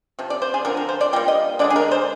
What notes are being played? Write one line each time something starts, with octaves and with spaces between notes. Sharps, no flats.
C3 F3
D5
C5
G#4
D3 F3 C4 A#4
A#4
C5
D5
G3 A#3 F4 G5
D#5
D3 G#3 D4 D5
G#4
A#4
C5